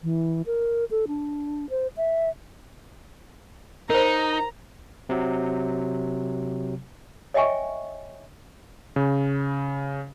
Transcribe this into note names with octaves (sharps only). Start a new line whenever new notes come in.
E3
A#4
A4
D4
C5
E5
D#4 A#4 C5 A#5
C3 F#3
C#5 D#5 E5 G5 G#5 C#6
C#3